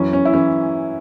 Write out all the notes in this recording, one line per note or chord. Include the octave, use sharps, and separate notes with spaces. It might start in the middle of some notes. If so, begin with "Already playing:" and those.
Already playing: F#2 E3 C#4
C#4
E4
E3 C#4